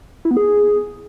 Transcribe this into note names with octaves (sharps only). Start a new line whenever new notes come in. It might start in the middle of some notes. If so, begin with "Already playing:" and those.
E4
B3
G#4